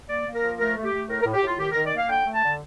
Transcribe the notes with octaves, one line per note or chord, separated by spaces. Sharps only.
A#3 D5
A#3
A#4
F3
A3 A#4
A3
G4
A3
A2 A#4
A#4
A2
G4
A2 F4
D#3 G4
D#3 A#4
D5
A#3 F5
D3 G5
A3
A5
D3